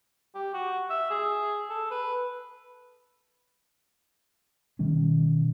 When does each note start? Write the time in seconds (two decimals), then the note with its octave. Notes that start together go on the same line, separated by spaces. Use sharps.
0.35 G4
0.54 F#4
0.90 E5
1.10 G#4
1.70 A4
1.91 B4
4.79 B2 D#3 G3 C#4